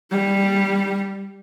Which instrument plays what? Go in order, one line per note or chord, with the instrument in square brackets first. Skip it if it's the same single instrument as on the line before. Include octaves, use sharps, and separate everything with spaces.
[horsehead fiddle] G3